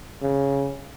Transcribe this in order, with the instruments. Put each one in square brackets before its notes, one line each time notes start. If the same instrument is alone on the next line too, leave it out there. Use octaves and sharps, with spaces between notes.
[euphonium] C#3